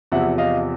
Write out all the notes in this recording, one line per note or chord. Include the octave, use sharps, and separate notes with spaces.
E2 C3 F3 E5 F#5
D#5 F5